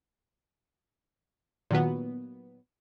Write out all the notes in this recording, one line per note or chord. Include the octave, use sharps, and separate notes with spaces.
A#2 D#3 F#3 B3